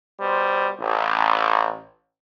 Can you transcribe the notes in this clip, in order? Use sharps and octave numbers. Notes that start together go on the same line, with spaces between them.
B2 G3 C5
A1